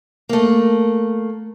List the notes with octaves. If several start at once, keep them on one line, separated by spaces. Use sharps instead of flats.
A3 A#3